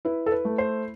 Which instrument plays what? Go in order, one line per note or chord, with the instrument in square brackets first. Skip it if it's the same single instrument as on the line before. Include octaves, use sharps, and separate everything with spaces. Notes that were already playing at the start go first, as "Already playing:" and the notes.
[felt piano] E4 B4
A4
B4
A3
C5